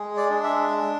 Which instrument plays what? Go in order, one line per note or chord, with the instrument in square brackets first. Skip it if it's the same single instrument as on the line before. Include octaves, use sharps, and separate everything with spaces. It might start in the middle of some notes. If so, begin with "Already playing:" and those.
Already playing: [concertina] G#3 G#4
D5
D4
E5